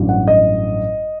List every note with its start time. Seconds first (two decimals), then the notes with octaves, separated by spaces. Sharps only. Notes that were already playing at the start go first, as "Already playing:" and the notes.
Already playing: A1 G2 F#3
0.09 F#5
0.28 D#5